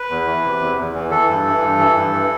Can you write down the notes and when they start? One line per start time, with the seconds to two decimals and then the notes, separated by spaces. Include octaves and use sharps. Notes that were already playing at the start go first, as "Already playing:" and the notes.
Already playing: B4
0.10 E2
0.27 E3
0.44 C3
0.60 E2
0.78 E2
0.95 E3
1.11 E3 A4
1.28 G2
1.45 E3
1.61 G2
1.79 E3
1.96 G2
2.13 E3